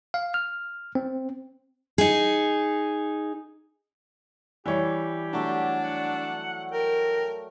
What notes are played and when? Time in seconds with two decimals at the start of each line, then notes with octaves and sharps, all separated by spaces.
0.14 F5
0.34 F6
0.95 C4
1.98 D#4 G#4
4.66 E3 G3 G4 C#5
5.33 F#3 A3 D4 D5
5.83 F#5
6.72 A#4 G5